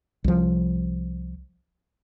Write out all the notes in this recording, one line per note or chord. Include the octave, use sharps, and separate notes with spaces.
C2 F3